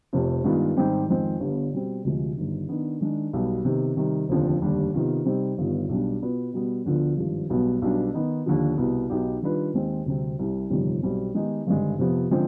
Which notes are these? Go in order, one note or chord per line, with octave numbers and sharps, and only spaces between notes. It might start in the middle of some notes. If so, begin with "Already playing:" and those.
F1 F2 C3
G2 D#3 G#3 B3 F4
G#2 D#3 G3 C4 G4
F2 D#3 G#3 C4
G1 G2 D3 G3 B3
B2 G3 C4
D2 C3 F3 G#3
G1 G2 D#3
D#3 B3 D4
D#3 G#3 D4
B1 B2 G3 B3
C3 D#3 B3
C3 D#3 G3
F1 D#2 D3 F3 C4
F1 D#2 D3 G3 D4
C3 D#3 B3 F4
C3 G3 C4 D#4
G1 G2 D#3 B3 F4
B1 B2 G3 D4
B2 B3 F4 B4
B2 G3 B3
D2 D3 F3 B3 F4
G#1 G2 F3
B1 B2 G3 B3
B1 B2 G3 B3 D4
D#3 B3 D#4
D#2 D3 F3
C2 B2 B3
B1 B2 B3 D#4 G4
D#3 G3 D4 F4 B4
D#2 D#3 G#3 C4
D2 C3 G3 C4
C2 C3 G3
G1 F2 C3 D#3 G3
B1 B2 G3 C4
D#3 G#3 B3 D#4 G4
G#1 G2 D3 G#3
F2 C3 F3 B3
D3 F3 G#3 C4